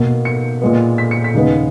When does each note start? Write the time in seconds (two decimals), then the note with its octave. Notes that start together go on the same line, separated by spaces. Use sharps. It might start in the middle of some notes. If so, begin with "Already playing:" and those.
Already playing: B2 A#3
0.25 C#7
0.62 A#2 G#3 B3
0.98 B6
1.11 C#7
1.24 B6
1.34 D#2 C#3 G#3 B3